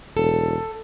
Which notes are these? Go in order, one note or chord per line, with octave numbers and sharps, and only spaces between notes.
E1 A4